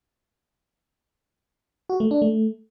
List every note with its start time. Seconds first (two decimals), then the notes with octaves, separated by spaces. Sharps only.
1.89 F#4
2.00 A3
2.11 D4
2.22 A3